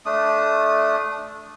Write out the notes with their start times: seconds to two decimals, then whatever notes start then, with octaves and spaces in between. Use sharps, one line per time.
0.06 A3 D4 D#6